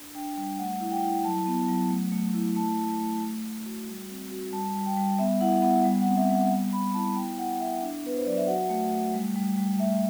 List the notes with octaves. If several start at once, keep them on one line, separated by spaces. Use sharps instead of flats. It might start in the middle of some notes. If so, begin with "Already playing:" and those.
Already playing: D4
D4 G5
G3 G5
A3 F#5
E4
G5
E4
F#3 A5
B3
F#3
A3
A3
E4
A3 A5
A3
A3
A3
A3
F#4
G3
C4
F#4
G3 A5
G3
G5
G3
B3 E5
E4 F#5
B3 F#5
G3
F#5
C4
E5
G3
F#5
B3
B3 B5
E4 A5
E4 G5
E4 F#5
E4 E5
D4
B3 B4
C5
F#3 D5
E5
F#4 F#5
A3
A3
G3
G3
G3
A3 E5